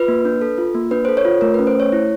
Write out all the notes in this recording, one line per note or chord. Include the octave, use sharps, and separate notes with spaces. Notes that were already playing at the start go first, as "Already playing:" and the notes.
Already playing: F4 B4
A#3
D4
A4
F4
A#3
D4 B4
C5
A4
C#5
F4
A3 A#4
B4
C#4
C5
A3
C#5
E4